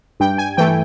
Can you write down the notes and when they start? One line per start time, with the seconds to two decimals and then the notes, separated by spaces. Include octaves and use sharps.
0.20 G2 G5
0.38 G#5
0.57 E3 A3 G5